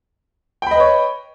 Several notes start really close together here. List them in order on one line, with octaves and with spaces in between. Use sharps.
G5 B5 D#5 B4 C#5